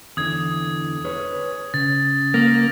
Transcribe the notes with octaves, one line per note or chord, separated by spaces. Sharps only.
E2 D3 E3 D#6 G#6
G#4 B4 C#5
C#3 A6
A#3 A#6